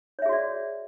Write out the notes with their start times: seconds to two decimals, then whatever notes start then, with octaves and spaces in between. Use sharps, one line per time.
0.19 C#5
0.22 E5
0.26 G#4
0.29 F#4
0.33 D5